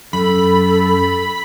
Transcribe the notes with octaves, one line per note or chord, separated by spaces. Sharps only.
F#2 A4 B5